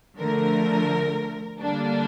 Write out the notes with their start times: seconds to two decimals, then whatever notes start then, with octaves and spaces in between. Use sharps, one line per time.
0.19 D3 F3 A3 A#4
1.61 D3 G3 A#3 D4